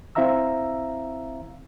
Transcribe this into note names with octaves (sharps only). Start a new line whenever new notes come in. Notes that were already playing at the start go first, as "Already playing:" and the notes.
C4 E4 E5 F5 A#5 E6